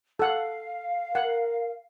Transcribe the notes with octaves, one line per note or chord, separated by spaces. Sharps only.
A4 F5 F#5
A#4 F#5